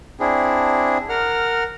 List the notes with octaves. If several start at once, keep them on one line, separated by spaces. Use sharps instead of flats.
C4 D4 E4 G#4
A#4 F#5 F6